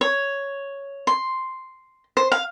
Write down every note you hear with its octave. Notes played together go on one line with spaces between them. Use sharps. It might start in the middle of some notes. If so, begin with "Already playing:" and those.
C#5
C6
C5
F5